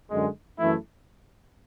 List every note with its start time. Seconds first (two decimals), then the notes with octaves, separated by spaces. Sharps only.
0.11 F#2 D3 G#3
0.59 F#2 E3 A3 E4